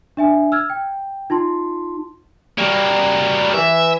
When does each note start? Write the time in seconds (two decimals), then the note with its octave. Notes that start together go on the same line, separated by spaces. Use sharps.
0.17 D4 E5 G#5
0.52 E6 F6 G#6
0.70 G5
1.30 D#4 F4 A5 C6
2.58 F#3 G3 A#3
3.54 E3 E5